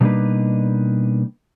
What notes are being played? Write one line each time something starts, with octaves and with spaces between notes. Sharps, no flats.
B2 G3 A#3 D4 D#4 B4